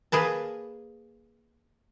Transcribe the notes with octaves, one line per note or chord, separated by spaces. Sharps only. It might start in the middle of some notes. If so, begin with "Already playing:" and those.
A#3 G#4 B4 A5